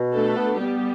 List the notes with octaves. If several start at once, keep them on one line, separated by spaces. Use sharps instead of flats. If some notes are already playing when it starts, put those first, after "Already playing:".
Already playing: B2
A3 D4 A4
B3
G3 B3 G4